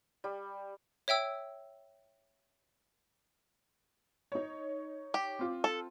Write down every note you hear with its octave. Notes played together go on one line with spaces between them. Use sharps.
G3
C#5 E5 G5 E6
D#4 C#5
G4
C4 F4
A4